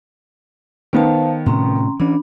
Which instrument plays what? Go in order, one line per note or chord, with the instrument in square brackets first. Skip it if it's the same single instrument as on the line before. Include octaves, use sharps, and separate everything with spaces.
[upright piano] D#3 B3 [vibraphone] C5 F5 A5
[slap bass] A2 C3 [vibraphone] C#4 A#5 C6
[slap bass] E3 C#4 [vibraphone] D4 B5